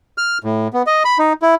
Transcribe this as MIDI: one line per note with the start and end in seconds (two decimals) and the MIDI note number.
0.18 0.38 89
0.44 0.68 45
0.73 0.82 59
0.87 1.03 75
1.05 1.18 83
1.18 1.33 63
1.42 1.55 64